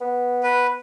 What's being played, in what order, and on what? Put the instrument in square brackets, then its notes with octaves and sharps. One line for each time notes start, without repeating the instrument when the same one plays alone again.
[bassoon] B3
[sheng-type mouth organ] B4